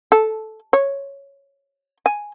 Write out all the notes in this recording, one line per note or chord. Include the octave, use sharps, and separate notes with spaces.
A4
C#5
G#5